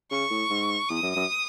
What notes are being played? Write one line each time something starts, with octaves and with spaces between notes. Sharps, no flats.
C#3 C#6
A2
G#2
E2 D#6
F#2
F#2